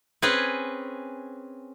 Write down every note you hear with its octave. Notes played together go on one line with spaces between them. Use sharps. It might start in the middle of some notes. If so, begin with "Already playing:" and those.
C4 C#4 G#4 B4